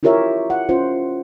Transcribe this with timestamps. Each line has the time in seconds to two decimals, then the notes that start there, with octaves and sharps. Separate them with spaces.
0.03 E4 F4 G4 A#4 C#5 E5
0.50 F#5
0.69 C#4 F4 C5